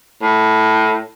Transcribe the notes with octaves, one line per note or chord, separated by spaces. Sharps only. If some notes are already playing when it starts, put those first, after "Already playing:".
A2